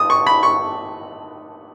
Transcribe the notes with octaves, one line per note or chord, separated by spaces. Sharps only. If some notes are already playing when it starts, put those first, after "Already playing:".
Already playing: D#6
C#6
B5
C#6